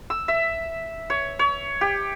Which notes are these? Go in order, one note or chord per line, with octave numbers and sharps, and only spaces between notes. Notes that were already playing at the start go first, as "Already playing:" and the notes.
E6
E5
C#5
C#5
G4